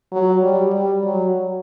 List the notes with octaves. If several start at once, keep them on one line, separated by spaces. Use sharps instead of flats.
F#3
G3
G3
F#3